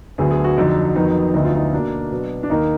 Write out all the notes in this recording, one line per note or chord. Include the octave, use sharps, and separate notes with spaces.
D2 D3 F#3 B3 G#4
G#4
F#4
F2 D3 F#3 D#4
F2 D#3 F#3 B3 D#4
D2 D3 F#3 B3 D#4
F4
D#4
B2 A#3 D4
B2 F#3 B3
D4
D#2 D#3 A#3 D#4